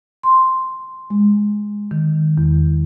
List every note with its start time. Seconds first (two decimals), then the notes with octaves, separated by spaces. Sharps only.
0.23 C6
1.10 G#3
1.91 D#3
2.38 E2